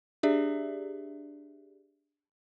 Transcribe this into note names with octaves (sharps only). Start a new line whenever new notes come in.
D4 G4 G#4 D5 E5